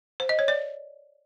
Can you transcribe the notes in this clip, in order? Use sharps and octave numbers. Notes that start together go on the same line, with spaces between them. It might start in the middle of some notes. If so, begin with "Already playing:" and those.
C5
D#5
C#5
D5